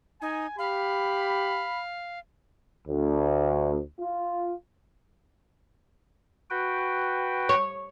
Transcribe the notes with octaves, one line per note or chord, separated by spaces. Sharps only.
D#4 G#5
G4 F5 B5
D2
F4
F#4 B4 G5
C#5